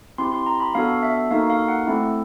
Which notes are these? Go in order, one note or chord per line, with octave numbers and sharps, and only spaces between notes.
C4 E4 G4 C6
C6
A#5
B5
B3 D4 F#4 A4 F5
E5
A#3 D#4 F#4 A4 F5
F5
F#5
A3 C4 E4 A4